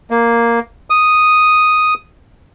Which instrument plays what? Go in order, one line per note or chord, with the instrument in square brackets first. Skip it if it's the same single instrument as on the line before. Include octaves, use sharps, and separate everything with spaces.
[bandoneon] A#3
D#6